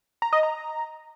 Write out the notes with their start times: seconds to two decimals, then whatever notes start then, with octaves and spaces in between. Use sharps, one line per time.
0.22 A#5
0.33 D#5
0.43 A#5